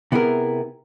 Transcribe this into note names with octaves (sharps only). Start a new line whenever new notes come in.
C3 B3 E4 G#4 A#4